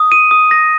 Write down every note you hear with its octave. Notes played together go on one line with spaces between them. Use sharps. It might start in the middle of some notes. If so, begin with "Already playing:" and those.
Already playing: D#6
D#7
D#6
A#6